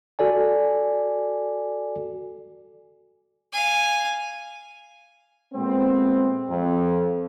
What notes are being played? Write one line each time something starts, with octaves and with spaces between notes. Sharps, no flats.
F#4 A4 D5 G#5
F5 G#5
A#2 G#3 A3 B3 C4
F2